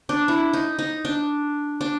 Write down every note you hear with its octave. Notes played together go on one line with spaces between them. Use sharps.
D4
E4
D#4
D#4
D4
D4